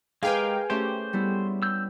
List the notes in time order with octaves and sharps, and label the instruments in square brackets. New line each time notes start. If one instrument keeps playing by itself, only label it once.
[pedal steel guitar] G#3 G4 A#4 [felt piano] G#4 B4 [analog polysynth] F5 G5 G#5
[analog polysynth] A3 G4 [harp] C#4 [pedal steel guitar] C5
[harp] G3 B3 E4
[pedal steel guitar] E6 G6